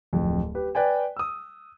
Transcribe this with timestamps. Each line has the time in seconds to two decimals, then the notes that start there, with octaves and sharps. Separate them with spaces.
0.13 D1 F2
0.55 G4 B4
0.75 B4 D5 G5 G#5
1.17 D#6 E6